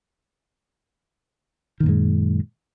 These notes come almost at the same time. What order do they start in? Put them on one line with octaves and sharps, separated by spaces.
D#3 A#2 F#2 G#3